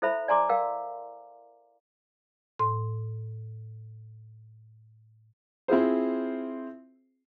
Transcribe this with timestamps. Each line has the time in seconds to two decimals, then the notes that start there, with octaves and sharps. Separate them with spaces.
0.02 E4 A4 C5 E5 B5
0.28 D5 G#5 A#5 C6 D6
0.49 A#4 F5 G5
2.59 A2 C6
5.68 C4 E4 F4 G#4 C5